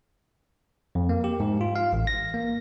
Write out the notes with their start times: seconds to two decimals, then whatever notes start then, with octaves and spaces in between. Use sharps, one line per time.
0.95 F2
1.09 A#3
1.24 G4
1.40 G#2
1.61 F4
1.76 F5
1.93 A1
2.07 A#6
2.34 A#3